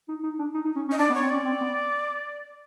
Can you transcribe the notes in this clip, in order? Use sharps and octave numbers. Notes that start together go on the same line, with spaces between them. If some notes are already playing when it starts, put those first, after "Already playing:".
D#4
D#4
D4
D#4
D#4
C#4
C#4
D#5
D4 D5
B3
C#5
C4
C#4 D5
C4
B3